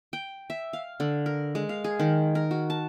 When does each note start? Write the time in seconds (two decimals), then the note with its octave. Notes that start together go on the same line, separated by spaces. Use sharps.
0.13 G5
0.50 E5
0.73 F5
1.00 D3
1.26 A#4
1.55 G#3
1.69 F5
1.84 G#4
2.00 D#3
2.35 A#4
2.51 F#4
2.70 A5